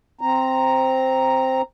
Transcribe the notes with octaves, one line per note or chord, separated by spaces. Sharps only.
C4 A#5